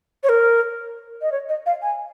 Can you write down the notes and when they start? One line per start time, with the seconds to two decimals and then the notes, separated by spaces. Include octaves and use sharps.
0.23 C#5
0.30 A#4
1.22 D#5
1.32 C#5
1.49 D#5
1.66 F5
1.82 G#5